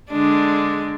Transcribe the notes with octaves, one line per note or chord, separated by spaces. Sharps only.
D3 G#3 D4